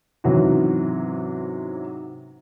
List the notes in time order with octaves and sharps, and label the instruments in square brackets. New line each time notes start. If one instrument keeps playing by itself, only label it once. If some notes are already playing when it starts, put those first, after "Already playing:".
[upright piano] G#2 C3 E3 F#3 C#4 F#4